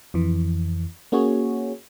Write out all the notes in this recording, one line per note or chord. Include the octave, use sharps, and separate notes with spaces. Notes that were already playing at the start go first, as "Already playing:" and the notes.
F2 E3
A#3 C#4 F#4 G#4 C#5